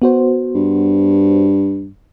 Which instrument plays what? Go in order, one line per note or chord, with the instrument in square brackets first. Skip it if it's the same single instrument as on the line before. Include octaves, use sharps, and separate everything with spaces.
[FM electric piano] B3 F#4 C5
[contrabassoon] G2